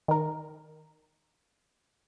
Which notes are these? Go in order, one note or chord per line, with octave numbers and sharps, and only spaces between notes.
D#3 A#4